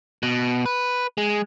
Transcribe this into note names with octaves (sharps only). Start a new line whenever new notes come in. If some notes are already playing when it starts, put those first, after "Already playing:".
B2
B4
G#3